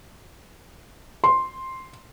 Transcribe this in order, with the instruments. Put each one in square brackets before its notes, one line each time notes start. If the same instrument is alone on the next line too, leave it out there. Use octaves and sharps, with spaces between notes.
[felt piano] C6